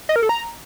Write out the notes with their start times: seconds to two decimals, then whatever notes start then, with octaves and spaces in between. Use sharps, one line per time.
0.09 D#5
0.16 A#4
0.23 A4
0.29 A#5